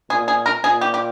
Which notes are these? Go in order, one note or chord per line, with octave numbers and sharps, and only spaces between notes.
A#2 G#4
G#4
A#4
A#2 G#4
G4
G4